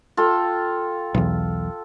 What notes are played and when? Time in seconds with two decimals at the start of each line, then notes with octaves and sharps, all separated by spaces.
0.17 F4 A4 G5
1.15 B1 E2